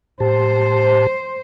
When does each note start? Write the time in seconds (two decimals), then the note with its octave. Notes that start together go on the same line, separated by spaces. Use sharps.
0.20 A2 G4 C5 A5